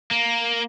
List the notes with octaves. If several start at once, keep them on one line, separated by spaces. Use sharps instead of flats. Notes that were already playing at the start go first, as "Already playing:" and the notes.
A#3